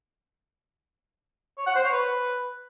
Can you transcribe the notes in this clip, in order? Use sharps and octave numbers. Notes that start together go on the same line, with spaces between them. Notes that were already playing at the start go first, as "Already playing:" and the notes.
C#5
F#5
C5
C#5
B4